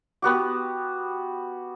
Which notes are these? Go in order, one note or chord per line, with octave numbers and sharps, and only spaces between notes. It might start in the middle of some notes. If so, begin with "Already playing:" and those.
B3 F#4 G4